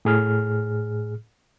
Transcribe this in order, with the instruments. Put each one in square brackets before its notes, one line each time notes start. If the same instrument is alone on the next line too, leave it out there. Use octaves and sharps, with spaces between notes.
[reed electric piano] A2 G#4 F6